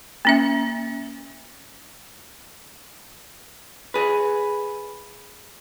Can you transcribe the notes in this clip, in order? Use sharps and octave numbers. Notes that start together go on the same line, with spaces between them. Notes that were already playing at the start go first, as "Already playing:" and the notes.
A#3 C#4 E5
G#4 B4